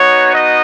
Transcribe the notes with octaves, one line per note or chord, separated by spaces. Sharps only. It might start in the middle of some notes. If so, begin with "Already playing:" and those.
Already playing: B3 D#4 F#4 C#5
D#5